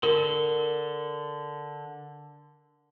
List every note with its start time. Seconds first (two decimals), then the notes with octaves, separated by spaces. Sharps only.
0.03 D3 A#4